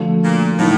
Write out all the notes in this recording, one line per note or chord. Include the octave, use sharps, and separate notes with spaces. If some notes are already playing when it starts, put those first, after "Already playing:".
Already playing: D3 F3 A3 D4 F#4
A#2
A2 F#3 A#3 D#4